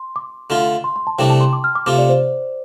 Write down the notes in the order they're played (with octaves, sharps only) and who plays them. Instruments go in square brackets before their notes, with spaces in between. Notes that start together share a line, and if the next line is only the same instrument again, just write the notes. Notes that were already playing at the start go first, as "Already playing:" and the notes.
Already playing: [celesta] C6
D6
[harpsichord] D3 A3 F4
[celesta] C6
C6
A5
[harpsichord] C2 C3 A3 D4 [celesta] G5
[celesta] A5
C6
D6
F6
D6
[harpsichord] C3 A3 F4 [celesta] D6
[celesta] D5
C5